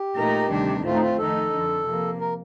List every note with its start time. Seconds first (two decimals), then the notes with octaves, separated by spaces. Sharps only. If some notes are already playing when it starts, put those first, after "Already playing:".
Already playing: G4
0.16 A#2 A3 D#4 A#4
0.50 D2 C3 D#3 G3 D4
0.84 A2 A3 C4 F4
0.94 D#4
1.01 F4
1.18 F2 D#3 A3 D#4 A4
1.52 F2 D3 F3
1.86 C3 F3 A#3
2.20 A#4